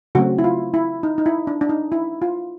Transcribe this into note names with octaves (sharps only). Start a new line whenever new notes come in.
C#3 F#3 A3 C4 F#4
E4
F4
E4
D#4
D#4
E4
D4
D4
D#4
E4
F4